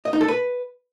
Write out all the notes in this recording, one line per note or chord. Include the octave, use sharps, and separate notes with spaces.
D#5
D#4
A4
B4